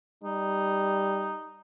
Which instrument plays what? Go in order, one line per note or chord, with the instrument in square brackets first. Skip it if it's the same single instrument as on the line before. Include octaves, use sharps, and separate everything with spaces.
[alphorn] G3 [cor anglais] D#4